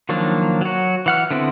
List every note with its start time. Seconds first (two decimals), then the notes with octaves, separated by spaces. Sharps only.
0.09 D#3 F3 F#3 A#3 D4
0.61 F#3 F#4
1.06 E3 F#5 F6
1.31 D3 B3 C4 E4